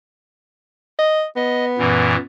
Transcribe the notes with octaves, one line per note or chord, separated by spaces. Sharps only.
D#5
B3 D#5
F#2 A#2 E3